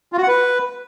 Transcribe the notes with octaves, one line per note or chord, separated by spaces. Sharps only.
F4
F#4
F#5
B4